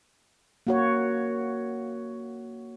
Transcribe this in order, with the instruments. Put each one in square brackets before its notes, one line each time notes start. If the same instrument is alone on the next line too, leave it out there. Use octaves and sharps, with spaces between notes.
[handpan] A#3 F#4 C#5